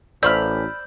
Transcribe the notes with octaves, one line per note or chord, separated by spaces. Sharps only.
A1 C5 D5 B5 C6 E6 F6 G6